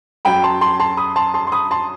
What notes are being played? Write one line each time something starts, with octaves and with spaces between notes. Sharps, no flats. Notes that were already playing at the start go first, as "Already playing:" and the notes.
F#2 F#3 G5 B5
A5 C6
A5 C6
A5 C6
B5 D#6
A5 C6
A5 C6
C6
B5 D#6
A5 C6